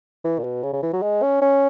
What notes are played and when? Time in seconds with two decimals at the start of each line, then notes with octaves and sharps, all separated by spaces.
0.24 E3
0.39 A#2
0.44 B2
0.63 C#3
0.73 C#3
0.82 E3
0.93 F#3
1.02 G#3
1.23 C#4
1.42 C#4